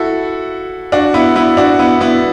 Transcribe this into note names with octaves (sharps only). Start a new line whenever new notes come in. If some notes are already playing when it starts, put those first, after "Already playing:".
Already playing: E4 F#4 A4
D4 F#4
B3 E4
B3 E4
D4 F#4
B3 E4
B3 E4